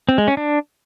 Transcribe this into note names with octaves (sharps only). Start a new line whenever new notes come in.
C4
G#3
C#4
D4